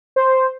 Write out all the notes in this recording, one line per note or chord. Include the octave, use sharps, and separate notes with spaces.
C5